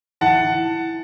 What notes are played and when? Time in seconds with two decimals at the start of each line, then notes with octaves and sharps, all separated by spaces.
0.21 E3 F#5 A5
0.44 E3